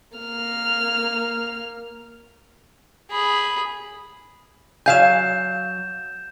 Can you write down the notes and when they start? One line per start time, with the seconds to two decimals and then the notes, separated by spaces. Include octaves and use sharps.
0.17 A#3 F6
3.10 G#4 B5
4.86 F#3 F5 G#5 G6 E7